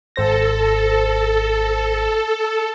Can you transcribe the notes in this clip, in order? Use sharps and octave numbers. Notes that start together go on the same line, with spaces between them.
G#1 A4 C5 A#6